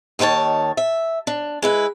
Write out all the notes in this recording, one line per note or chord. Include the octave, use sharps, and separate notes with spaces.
D#2 D#3 B4 C#5 A5
E5
D4
G#3 E4 B4